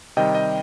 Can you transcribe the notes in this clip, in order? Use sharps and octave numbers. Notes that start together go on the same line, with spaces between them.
C3 D#3 G3 D#5 G5
D#5